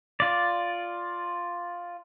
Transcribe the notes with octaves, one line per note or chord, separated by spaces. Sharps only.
F4 D5